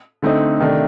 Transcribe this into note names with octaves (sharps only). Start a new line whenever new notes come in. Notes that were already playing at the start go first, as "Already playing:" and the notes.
D3 A3 C4 D#4
C3 D#3 A3 D4